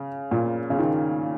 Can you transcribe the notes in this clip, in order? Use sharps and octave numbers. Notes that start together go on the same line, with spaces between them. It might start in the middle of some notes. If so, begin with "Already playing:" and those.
Already playing: C#3
A#2
C#3
D#3